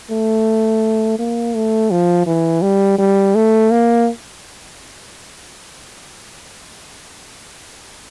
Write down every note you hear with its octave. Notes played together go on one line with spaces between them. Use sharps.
A3
A#3
A3
F3
E3
G3
G3
A3
A#3